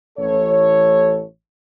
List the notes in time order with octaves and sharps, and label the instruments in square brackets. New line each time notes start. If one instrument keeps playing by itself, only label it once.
[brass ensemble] A1 A4 C#5